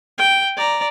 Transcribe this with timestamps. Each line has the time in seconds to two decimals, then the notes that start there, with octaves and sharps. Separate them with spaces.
0.18 G5
0.56 D5 A#5